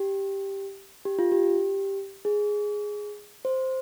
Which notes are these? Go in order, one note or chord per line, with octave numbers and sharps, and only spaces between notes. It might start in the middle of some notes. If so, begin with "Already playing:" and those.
Already playing: G4
G4
F4
G4
G#4
C5